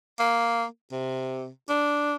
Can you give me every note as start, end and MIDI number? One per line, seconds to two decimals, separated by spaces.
0.19 0.64 58
0.92 1.49 48
1.69 2.16 62